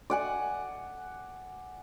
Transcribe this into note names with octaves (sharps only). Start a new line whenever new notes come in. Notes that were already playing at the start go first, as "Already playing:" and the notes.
D5 F#5 G#5